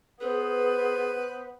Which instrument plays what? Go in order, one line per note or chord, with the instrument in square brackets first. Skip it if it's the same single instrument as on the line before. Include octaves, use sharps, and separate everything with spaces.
[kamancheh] B3 [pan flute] G#4 [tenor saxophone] B4 [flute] C5